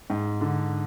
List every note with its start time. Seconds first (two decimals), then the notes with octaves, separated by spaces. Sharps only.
0.10 G#2
0.41 D3